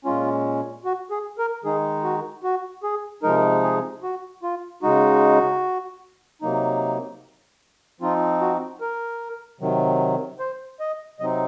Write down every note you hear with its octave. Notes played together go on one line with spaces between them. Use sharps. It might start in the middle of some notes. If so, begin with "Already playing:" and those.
A#2 G#3 C#4 F4
F#4
G#4
A#4
D#3 G#3 D#4 G#4
F#4
F#4
G#4
C3 F3 G#3 D#4 A#4
G#4
F#4
F4
C#3 G#3 D#4 F#4
C3 F#3 A#3 D#4
F3 C4 D#4 F4
F#4
A#4
C3 D#3 F#3
C5
D#5
C3 F#3 C4 D#4 D#5